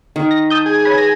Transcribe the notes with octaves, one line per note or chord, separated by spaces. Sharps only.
D#3
A#6
A5 D#6 G6
G#4
B4 C#5
A#6